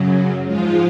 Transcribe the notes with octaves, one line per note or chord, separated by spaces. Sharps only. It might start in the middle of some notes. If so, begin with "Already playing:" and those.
Already playing: F#2 C#3 F#3
G#2 F3 G#3 F4